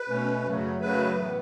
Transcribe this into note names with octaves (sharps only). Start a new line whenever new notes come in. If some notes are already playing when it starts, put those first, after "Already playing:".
Already playing: B4
B2 A3 C#4
F#2 C#3 F#3 A3
F#2 C#3 F#3 A3 B4
A2 E3 B3